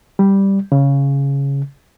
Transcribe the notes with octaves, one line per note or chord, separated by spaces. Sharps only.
G3
C#3